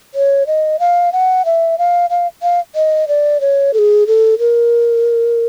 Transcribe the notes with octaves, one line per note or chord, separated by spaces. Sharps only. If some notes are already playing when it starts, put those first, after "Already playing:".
C#5
D#5
F5
F#5
E5
F5
F5
F5
D#5
D5
C#5
A4
G#4
A4
A#4